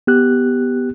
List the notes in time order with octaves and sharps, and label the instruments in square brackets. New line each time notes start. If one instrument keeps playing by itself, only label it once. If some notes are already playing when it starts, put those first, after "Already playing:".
[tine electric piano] B3 G4 F#6